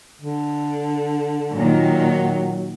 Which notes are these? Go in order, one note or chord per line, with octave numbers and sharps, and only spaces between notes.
D3
A#2 D#3 F#3